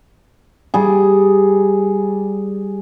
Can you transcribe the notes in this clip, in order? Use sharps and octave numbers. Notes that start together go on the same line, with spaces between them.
G3 G#4